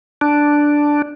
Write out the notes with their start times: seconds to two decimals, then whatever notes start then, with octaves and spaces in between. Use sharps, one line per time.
0.21 D4